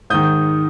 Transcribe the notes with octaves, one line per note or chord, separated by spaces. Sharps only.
G#2 D#3 D#6 G6